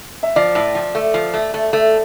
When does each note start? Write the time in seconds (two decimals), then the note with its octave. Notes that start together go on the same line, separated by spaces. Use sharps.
0.23 E5
0.36 F3 D5
0.55 A2
0.75 F3
0.95 A3
1.14 F3
1.34 A3
1.54 A3
1.73 A3